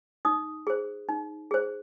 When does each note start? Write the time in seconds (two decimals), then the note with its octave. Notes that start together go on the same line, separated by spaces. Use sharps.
0.25 D#4 D#6
0.67 G#4 C5
1.09 D#4
1.51 G#4 C5